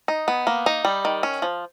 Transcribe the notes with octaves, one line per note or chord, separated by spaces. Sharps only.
D#4
B3
A#3
D#4
G3
D#3
C#4
F3